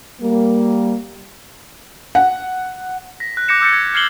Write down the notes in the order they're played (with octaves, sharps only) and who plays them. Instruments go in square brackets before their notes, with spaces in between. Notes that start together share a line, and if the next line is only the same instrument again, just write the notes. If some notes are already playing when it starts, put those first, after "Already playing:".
[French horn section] G3 A#3
[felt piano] F#5
[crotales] A#6 B6
F#6
D6 G6 A#6 C#7 E7
D6 E6 G6 A6 C#7
G#6
F6 G#6 C7 C#7 F#7 G7